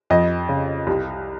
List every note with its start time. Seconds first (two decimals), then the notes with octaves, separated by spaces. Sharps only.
0.10 F2 D#5
0.49 C#3
0.87 C2